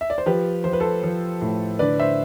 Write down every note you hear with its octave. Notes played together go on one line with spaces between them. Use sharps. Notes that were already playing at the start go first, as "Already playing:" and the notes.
E5
D5
C5
F3 G4 B4
F3 C5
B4
A4 C5
F3
A2
D3 B4 D5
C5 E5